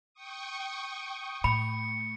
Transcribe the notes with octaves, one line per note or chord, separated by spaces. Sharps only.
G5 C#6 D#6
A2 B5 C#7